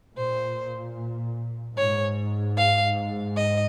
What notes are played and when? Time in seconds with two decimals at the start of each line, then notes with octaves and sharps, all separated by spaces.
0.17 A#2 C5
1.76 G#2 C#5
2.57 F5
3.36 D#5